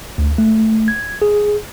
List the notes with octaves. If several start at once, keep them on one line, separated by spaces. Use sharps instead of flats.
D2
A3
G#6
G#4